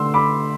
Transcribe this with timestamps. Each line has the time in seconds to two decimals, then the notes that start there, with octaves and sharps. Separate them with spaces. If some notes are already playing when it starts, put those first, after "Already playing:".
Already playing: D3 A3 D4 C6 E6
0.14 B5 D6